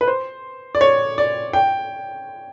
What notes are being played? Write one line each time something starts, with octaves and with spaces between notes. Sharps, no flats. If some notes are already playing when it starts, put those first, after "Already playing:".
B4
C5
D5
C#5
D5
G5